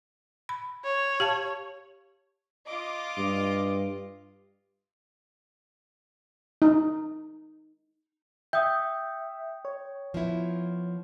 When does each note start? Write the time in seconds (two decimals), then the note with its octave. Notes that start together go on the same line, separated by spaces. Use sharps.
0.49 B5
0.84 C#5
1.20 G4 F5 A5
2.66 F4 D#5 D6
3.17 G2
6.62 D#4
8.53 E5 G5 D#6 G6
9.65 C#5
10.14 F3 B3 E4